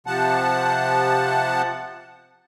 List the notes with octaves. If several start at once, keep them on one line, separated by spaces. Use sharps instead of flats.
C3 F3 F#5 A5